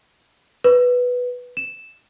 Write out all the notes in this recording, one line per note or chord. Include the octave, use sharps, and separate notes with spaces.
B4
E7